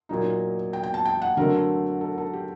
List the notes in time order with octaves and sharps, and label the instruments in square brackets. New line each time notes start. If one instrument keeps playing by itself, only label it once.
[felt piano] A#2 F#3 A#3 D#4
G5
G5
A5
G5
F#5
D3 F#3 A3 C4 A#4
A4
A4
G4